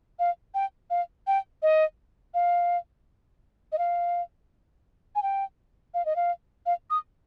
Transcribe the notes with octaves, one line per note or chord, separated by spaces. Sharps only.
F5
G5
F5
G5
D#5
F5
D#5
F5
G#5
G5
F5
D#5
F5
F5
D#6